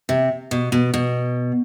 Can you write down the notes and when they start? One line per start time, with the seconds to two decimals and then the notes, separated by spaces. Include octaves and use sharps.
0.09 C3
0.51 B2
0.72 B2
0.94 B2